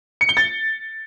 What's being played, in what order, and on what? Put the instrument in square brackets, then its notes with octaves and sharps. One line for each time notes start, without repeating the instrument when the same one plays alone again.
[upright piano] C#7
G7
A6